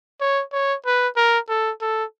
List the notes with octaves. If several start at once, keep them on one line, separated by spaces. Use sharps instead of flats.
C#5
C#5
B4
A#4
A4
A4